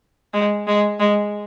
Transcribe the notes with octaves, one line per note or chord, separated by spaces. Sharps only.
G#3
G#3
G#3